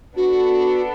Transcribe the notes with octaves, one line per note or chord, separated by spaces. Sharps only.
B3 D4 F#4 A4